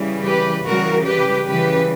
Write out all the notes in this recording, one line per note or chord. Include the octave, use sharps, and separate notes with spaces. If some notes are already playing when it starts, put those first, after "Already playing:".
Already playing: C#3 E3 G3
G4 B4
C#3 E3 G3 F#4 A#4
G4 B4
C#3 E3 G3 G4 B4